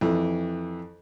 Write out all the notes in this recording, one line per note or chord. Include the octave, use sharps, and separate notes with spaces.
F2 E3